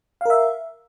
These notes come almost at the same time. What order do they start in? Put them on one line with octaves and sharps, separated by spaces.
F5 A#4 E5